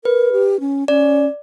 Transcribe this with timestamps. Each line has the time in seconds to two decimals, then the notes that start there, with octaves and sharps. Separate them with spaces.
0.05 A#4 B4
0.32 G4
0.60 C#4
0.88 C#4 D5